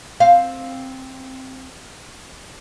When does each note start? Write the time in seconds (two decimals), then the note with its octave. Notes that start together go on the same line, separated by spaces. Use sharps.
0.20 C4 F5